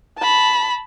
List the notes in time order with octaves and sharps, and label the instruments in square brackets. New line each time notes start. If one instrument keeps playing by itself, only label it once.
[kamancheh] A5 B5